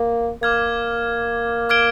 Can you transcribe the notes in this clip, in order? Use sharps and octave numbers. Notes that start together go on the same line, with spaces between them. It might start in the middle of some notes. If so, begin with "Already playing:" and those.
Already playing: A#3
A#3 D6 F6 G#6
D6 F6 G#6 D7 G7